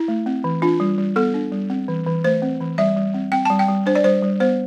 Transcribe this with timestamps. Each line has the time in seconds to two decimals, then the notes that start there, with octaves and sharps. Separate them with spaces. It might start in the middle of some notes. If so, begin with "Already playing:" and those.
Already playing: E4
0.08 A3
0.26 C4
0.44 E3
0.62 D4 F4
0.80 G3
0.98 G3
1.16 B3 A4
1.34 D4
1.52 G3
1.70 C4
1.88 E3
2.06 E3
2.24 A3 C5
2.42 C4
2.61 E3
2.78 G3 E5
2.96 G3
3.14 C4
3.32 C4 G5
3.45 G3 A5
3.59 G5
3.68 G3
3.86 D4 C5
3.95 D5
4.04 G3 C5
4.22 G3
4.40 B3 C5